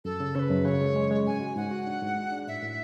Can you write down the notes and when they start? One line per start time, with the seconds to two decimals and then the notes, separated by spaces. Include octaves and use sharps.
0.05 F#2 A4
0.20 C#3
0.35 C#3 B4 C#5
0.51 F#2
0.65 C#3 C#5
0.81 G#3
0.96 G#3
1.11 G#3
1.26 G#2 G#5
1.41 F#4
1.56 G#2 F#5
1.71 F#4
1.87 D4
2.02 G#2
2.17 G#3
2.32 D4
2.47 A2 E5
2.63 A2